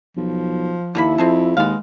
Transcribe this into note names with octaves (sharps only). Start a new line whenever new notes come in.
B1 F3
D#2 D3 A#3 E4 B5
F2 C4 G#4 A4
D#2 G#3 B3 F5